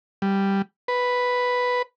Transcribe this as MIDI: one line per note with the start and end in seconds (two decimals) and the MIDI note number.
0.22 0.62 55
0.88 1.82 71